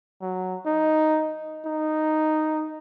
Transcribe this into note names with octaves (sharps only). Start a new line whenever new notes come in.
F#3
D#4
D#4